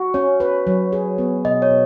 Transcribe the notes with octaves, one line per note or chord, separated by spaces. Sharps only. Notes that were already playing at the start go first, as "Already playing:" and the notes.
Already playing: F#4
C#4 C#5
B4
F#3
G#4
B3
B2 D#5
C#5
B2